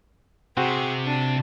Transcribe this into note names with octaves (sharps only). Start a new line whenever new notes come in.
C3 C4 F#4 G#4
D4